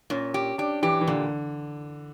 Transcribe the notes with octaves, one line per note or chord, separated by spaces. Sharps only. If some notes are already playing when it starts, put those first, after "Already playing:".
A#2 C#4
G4
D4 G4
E3 G4
E3
A#2 D3